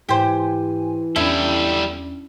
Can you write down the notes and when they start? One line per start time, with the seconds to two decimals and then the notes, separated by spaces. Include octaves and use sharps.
0.09 G#2 E3 G4 C5 G#5
1.16 E2 G3 C#4 D4 E4 A4